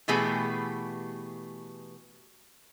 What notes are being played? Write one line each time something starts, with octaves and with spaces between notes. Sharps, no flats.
B2 E3 A3 B3 G4 G#4